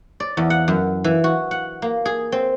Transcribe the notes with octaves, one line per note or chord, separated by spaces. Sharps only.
D5
E2
F#5
F#2
E3
F#4
F#5
A#3
G#4
C4